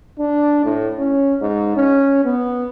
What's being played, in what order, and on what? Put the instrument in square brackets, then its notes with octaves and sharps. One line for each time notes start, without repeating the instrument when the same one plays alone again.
[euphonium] D4
A2
C#4
G#2
C#4
B3